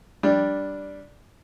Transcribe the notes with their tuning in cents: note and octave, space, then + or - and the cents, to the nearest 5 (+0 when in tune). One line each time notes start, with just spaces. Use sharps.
G3 +0 D4 -5